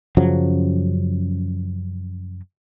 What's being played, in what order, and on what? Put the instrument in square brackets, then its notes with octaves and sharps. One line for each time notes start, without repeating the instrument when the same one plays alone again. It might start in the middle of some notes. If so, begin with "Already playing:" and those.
[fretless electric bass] F#2 C#3 F3 F#3